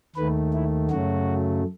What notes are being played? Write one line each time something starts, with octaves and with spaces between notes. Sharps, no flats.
D#2 D#3 A3 B4
E4
F#2 C#3 F#3 A3 F#4